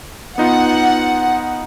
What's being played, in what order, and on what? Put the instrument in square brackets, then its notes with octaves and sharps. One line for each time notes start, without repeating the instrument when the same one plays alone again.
[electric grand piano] B3 D#4 F4 [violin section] F#5